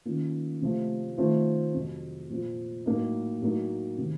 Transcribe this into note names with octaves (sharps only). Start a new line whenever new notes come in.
D#3 A#3 C#4 F4
C3 F3 A3
D#3 A3 C4 F4
F2 C3 F#3
A#2 F3 C4 F4
A2 F#3 A#3 D#4
A2 F#3 A#3 D#4
C3 D#3